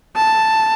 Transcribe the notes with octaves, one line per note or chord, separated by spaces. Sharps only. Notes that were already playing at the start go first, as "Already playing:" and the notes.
A5